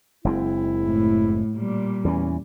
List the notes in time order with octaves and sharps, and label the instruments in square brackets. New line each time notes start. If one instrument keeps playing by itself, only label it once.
[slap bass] F#1 G#3 C4 [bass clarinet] E4
[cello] A2
A#2 G3
[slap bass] E2 E3 [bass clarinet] C#4